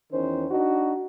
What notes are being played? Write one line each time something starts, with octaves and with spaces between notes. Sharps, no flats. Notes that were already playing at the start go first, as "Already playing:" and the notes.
E2 D#3 C#4 C5
D4 D#4 F#4